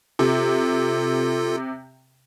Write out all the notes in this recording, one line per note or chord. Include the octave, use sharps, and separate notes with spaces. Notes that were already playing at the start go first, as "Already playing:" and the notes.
C3 F4 A4